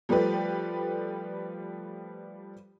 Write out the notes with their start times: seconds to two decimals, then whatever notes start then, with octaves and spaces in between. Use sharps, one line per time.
0.09 F3 G3 A3 G4 B4